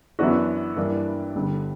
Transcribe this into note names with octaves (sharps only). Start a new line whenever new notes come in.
F#2 E3 B3 D4 F#4
G2 E3 A#3 D4
G1 G2 D3 G3